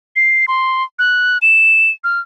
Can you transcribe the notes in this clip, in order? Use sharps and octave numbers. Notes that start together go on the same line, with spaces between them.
C7
C6
F#6
E7
F6